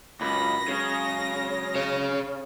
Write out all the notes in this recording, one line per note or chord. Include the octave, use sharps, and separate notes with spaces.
C#2 F#2 A#4 B5 A#6
C#3 F#3 G#3
G#4 C#5